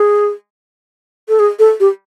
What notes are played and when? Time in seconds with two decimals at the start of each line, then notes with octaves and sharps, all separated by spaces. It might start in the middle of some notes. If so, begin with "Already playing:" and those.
Already playing: G#4
1.29 A4
1.39 G#4
1.59 A4
1.80 G4